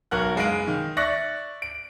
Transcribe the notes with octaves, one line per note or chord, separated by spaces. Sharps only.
B1 F#4 A#4 F#5 F#6
F#1 G#3 F5 D7
D#3
D5 E5 C#6 F#6 A#6 C#7
D7